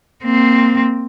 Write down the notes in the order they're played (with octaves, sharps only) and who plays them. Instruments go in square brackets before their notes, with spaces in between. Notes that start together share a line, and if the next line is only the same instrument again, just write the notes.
[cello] A#3 C4